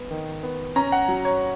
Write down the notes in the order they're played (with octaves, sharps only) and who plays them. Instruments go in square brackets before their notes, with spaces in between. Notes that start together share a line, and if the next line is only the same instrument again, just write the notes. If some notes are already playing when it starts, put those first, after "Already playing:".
Already playing: [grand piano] B3
D#3
B3
C#4 A#5
F#5
F#3
C#5